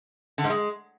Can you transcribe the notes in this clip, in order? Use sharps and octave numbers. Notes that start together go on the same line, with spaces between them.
D3
G#2
G#3